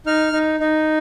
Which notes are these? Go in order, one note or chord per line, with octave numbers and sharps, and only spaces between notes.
D#4 F6
D#4
D#4